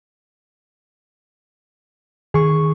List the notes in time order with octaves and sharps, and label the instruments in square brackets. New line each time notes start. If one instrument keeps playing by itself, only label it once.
[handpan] D#3 [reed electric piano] G#4 C#6